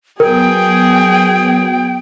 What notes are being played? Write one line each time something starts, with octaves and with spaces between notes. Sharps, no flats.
F#3 B3 G#4 A#4 G5